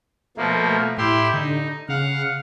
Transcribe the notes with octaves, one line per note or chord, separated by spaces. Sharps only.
B2 F3 A3 A#3
A2 E4 G4 C6
D3 D#4
C#3 F5 F#5